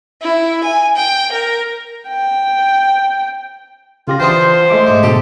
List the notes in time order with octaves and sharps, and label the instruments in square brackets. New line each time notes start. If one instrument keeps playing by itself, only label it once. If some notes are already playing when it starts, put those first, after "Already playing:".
[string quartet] E4
G#5
G5
A#4
[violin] G5
[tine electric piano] C#3 G4 A#6 [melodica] F4
[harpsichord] E3 D4 [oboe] C5 [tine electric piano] G5 D#6
[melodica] G#3 [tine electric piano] A3 E5 D6
[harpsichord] G#2
[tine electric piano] B2 D3 F#4 [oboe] G4 [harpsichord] A4